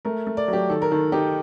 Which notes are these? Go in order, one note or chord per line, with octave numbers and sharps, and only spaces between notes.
A3 A#4
A3
D5
F#3
G4
D#3 A4
A#4
D#3 A4
D#4 G4